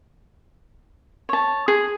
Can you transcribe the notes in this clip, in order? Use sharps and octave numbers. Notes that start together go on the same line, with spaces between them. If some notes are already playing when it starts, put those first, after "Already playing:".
C#5 A5
G#4